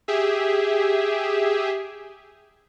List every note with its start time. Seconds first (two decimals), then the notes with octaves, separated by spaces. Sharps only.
0.08 G4 G#4 E5